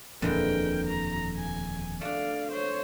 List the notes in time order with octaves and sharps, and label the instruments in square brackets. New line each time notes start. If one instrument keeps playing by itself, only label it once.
[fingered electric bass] D#1 F2 A#2 [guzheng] D3 E3 G#3 [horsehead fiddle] A#4 G5
[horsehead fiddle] A#5
G#5
[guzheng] A3 D4 [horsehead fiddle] D5 F5
[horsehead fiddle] C5 C#5